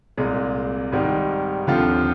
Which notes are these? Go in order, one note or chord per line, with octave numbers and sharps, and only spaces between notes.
C2 A#2 G#3
G#2 D#3 G3
D#2 D3 F3 C4 F4